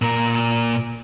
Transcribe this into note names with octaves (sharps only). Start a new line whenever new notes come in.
A#2 A#4